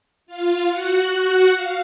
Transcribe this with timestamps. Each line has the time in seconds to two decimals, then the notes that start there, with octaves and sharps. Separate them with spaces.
0.26 F4 F5
0.69 F#4 F#5
1.11 F#4 F#5
1.53 F5